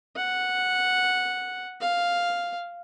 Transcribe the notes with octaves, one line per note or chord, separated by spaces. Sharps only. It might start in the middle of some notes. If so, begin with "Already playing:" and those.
F#5
F5